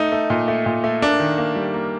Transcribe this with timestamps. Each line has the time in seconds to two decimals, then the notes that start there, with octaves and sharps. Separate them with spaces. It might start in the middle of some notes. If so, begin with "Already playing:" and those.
Already playing: A3 D#4
0.12 A3
0.30 A#2
0.48 A3
0.66 A#2
0.84 A3
1.02 A#3 D4
1.20 D#3
1.38 A#3
1.56 G3
1.74 A#3